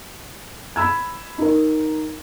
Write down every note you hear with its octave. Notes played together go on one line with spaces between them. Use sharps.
B5 E6 G#6
D#4 A#4